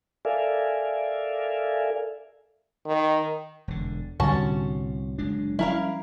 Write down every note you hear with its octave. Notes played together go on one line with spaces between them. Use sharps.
A4 A#4 D5 E5 F5 G#5
D#3
E1 D3
C2 A2 D3 G3 C#4 F#4 A5
F#1 G#3 D4
F3 G3 C#4 E4 A#4 F5